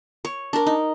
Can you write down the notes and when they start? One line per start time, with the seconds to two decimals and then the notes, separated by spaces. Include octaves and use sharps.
0.25 C#5
0.53 D4 A#4
0.66 D#4